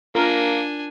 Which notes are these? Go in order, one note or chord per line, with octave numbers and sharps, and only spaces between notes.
A#3 D4 F4 A#4 G#5